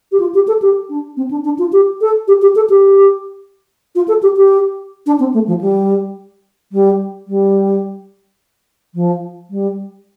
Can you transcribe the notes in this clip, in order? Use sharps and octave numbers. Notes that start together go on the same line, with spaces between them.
G4
F4
G4
A4
G4
D4
C4
D4
D4
F4
G4
A4
G4
G4
A4
G4
F4
A4
G4
G4
D4
C4
A3
F3
G3
G3
G3
F3
G3